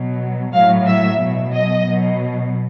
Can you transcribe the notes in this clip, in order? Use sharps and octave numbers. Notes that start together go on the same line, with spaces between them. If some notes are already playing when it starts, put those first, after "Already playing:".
Already playing: B2 F#3
A2 F#3 F5
E5
B2 F#3
D#5
B2 F#3